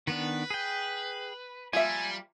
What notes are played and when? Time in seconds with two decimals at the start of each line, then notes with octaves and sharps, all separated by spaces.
0.07 D#3 B3 D4 B4
0.50 G#4 G5
1.73 F3 G3 A#3 E5 G#5